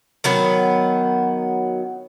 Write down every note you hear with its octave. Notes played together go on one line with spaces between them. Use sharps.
D#3 F#3 B3